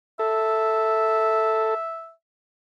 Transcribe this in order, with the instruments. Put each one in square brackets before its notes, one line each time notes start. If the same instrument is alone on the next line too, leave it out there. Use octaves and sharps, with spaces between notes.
[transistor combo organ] A4 [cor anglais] E5